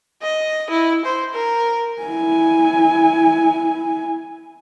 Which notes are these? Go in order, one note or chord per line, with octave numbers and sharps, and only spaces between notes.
D#5
E4
C5
A#4
E4 G#5